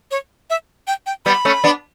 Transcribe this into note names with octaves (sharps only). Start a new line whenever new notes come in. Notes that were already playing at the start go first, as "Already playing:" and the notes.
C#5
E5
G5
G5
G3 B3 B5
A3 C#4
B3 D4